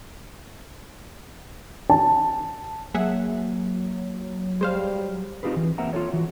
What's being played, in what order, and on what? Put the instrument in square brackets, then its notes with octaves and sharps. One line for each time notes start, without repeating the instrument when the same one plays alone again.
[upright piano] A5
[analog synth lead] F#3 [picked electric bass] A#3 [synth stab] G#4 E5 F#5
[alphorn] G3 [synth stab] G#3 C5 F5
[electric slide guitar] C4 D#4 F4 G4 G#4 B4
E3
A#3 C4 E5 F#5 A#5
F4 F#4 A4 C#5
E3 F#4